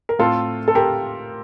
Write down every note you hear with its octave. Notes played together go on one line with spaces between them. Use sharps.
A#4
A2 A3 C4 F4 A4
A4
G4 A#4